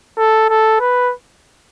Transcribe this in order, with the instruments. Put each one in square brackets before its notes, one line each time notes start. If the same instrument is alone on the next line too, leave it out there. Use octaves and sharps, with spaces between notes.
[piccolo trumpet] A4
A4
B4